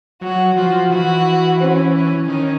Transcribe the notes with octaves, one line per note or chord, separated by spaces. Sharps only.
F#3 F#4
F3 F#4
E3 F#4
C#4
C#4
D#3 C#4